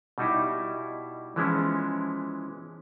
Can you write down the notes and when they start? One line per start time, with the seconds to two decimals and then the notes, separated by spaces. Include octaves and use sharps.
0.18 B2 G3 D#4 E4
1.36 E3 F3 G#3 B3 C#4 E4